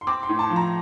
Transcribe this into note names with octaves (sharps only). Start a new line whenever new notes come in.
C6
C4 D6
C6
A2
A5
F3
A#5